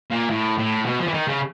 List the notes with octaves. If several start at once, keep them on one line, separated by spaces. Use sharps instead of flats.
A#2
A2
A2
B2
F3
E3
D#3
C#3